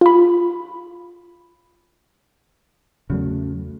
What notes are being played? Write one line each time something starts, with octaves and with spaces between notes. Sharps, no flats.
F4 B5
E2 C#3 F#3 A3